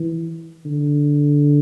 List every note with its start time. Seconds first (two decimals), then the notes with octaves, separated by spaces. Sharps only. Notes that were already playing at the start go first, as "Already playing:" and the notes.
Already playing: E3
0.66 D3